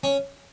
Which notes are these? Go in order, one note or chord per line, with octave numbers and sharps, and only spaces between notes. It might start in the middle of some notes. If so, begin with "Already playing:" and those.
C#4